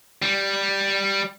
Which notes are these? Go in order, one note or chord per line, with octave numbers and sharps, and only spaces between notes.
G3